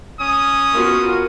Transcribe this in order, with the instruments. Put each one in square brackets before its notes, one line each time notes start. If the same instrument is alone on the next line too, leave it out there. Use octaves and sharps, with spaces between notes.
[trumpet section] C#4 D#6
[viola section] B3 F4 F#4 [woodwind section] A#4